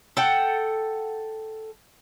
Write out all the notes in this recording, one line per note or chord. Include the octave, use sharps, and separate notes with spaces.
A4 F#5 G5